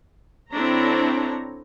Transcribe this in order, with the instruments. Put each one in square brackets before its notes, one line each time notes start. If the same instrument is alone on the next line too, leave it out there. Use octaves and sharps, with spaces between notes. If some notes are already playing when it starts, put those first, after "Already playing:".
[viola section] D3 C4 D4 E4 C#5 A#5